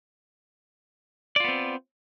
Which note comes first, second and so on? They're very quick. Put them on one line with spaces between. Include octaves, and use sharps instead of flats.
D5 F4 B3 C4